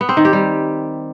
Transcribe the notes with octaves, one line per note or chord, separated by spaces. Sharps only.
B3
C4
D#3
G4
G3